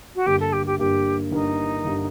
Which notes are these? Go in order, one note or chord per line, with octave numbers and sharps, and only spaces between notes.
F#4
G1 G2 D3 G3 A#3 G4
A4
G4
G4
G1 G2 D3 G3 A#3 G4
G1 G2 D3 G3 A#3 D#4
G1 D3 G3 A#3